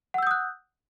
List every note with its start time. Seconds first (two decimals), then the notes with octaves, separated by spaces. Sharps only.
0.14 F#5
0.18 E6
0.23 G6
0.27 D#6
0.31 F#6